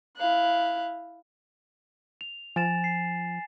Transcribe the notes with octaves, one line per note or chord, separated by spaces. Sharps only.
E4 F5 F#6
F7
F3 G#5 A6 E7
C7